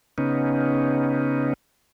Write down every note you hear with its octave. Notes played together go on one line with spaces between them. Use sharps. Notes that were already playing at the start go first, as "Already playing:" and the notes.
C#3 B3 C#4 D#4